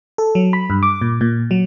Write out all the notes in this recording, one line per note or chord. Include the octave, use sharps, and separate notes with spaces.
A4
F#3
B5
G2
D6
A#2
A#2
F#3